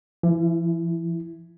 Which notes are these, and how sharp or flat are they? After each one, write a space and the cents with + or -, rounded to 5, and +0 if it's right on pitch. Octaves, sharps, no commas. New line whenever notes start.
E3 +45 E4 +5